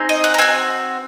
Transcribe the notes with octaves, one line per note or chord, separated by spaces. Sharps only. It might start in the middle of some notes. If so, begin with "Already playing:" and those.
Already playing: C4 D#4 G#4
D#5
F#5
A#5
C4 F#4 G#5